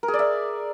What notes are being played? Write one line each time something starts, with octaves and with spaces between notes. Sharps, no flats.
A#4
G#4
D5
E5